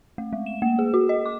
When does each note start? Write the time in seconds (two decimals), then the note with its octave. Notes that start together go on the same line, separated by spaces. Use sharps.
0.18 A3
0.33 G#3
0.46 E7
0.62 A#3
0.79 G#4
0.94 F#4
1.09 D#5
1.26 D6